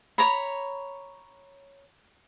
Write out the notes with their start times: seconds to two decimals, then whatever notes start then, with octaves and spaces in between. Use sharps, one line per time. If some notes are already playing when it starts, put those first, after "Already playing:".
0.18 C#5 A#5 B5